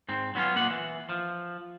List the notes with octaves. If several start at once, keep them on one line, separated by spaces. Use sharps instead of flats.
G#2 C4
F#3 B3 C#4 E4 F4
A#2 A#3 F#5
E3
F3